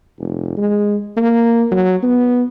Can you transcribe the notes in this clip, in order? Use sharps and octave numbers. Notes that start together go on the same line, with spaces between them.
F1
G#3
A#3
F#3
B3